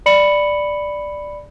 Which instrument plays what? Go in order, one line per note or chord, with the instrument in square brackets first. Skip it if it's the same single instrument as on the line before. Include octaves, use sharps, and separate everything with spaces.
[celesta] D5 B5 C#7 F#7